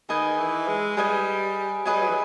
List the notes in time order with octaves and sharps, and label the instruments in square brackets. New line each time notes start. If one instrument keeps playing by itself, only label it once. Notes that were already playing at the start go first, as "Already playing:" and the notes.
[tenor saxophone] D#3 [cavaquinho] G#4 B4 D#5 G#5
[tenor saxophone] E3
G#3
[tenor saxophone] G3 [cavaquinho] G#4 B4 D#5 G#5
[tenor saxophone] F#3 [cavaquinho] G#4 B4 D#5 G#5
[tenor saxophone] G3
F#3
E3